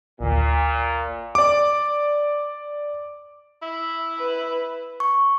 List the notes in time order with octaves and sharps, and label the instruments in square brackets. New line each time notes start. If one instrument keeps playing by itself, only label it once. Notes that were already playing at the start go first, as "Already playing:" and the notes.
[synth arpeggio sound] A1 D2 [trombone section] A#2
[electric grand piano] D5 D6
[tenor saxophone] E4
[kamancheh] B4
[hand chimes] C#6